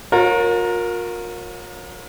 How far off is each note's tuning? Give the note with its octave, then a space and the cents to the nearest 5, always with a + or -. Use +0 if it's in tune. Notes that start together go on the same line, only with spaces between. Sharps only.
F4 +45 A#4 +0 C#5 -20